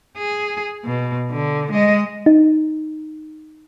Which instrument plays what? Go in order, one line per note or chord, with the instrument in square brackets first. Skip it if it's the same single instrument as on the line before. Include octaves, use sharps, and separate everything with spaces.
[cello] G#4
B2
D3
G#3 D#5
[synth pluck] D#4